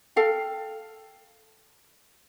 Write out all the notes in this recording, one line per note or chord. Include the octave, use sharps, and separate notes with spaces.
A4 F5 G5